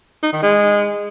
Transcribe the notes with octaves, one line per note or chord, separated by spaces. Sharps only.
D#4
D#3
G#3